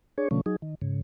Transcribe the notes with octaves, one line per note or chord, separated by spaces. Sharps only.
D4 G#4 C#5
B2 D3 F3 A3 C#4
F#3 D#4 G#4
D#3
G#2 C#3